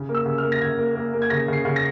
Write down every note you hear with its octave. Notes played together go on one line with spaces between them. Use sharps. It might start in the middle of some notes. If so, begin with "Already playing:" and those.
Already playing: C#3
A#3
E6
C#3
F6
A#3
A#6
C#3 G#6
A#3
A#3
A#3
G#6
C#3 A#6
C#3 C7
C#3
A#6